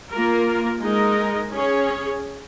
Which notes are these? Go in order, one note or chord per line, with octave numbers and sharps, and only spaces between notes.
A#3 F4 A#4
G#3 D#4 A#4 D#5
C#4 G#4 C#5